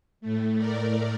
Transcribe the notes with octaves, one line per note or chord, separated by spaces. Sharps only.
A2 A3
A#4 D5